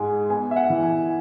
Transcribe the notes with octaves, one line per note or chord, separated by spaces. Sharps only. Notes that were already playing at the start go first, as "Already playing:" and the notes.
Already playing: G#2 G#3 G#5
B3 G#5
E5
F#5
E3
G#5